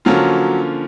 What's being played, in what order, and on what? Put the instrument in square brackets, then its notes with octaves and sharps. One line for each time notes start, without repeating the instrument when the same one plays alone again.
[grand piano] D3 F3 A#3 C#4 F4 [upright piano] F#3